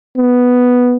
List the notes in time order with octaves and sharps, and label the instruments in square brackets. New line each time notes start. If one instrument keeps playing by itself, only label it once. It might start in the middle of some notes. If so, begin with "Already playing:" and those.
[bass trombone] B3